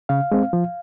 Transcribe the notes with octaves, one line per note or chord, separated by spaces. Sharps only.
C#3 F5
G#3 C4
F3